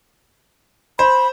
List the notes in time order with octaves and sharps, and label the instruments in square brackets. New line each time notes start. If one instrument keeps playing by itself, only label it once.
[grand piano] C5 [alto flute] B5